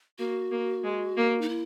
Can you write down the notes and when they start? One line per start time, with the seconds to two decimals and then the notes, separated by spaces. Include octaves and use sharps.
0.18 A#3 F#4
0.51 A#3
0.84 G#3
1.17 A#3
1.41 D#4
1.49 E4